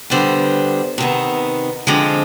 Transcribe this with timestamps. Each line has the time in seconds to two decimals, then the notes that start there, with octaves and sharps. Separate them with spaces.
0.10 D3 G3 B3 C5
0.98 C3 D#3 B3
1.87 D3 F3 G#3 C4